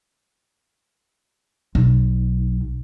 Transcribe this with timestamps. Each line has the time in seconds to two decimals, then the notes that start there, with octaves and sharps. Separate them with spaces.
1.75 B1